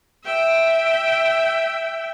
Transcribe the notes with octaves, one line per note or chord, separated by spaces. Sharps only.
E5 G5